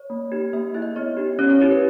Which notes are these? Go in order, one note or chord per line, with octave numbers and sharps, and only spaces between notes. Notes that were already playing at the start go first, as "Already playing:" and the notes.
Already playing: C#5
A#3
D#4 G4
A#3 E5
E4 G#4 E5
D#5
B3 C#5
D#4 G4
C#4 C#5
C#5
E4 G4 C#5
B4